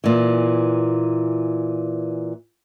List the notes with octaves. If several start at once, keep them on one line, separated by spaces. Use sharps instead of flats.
A#2 E3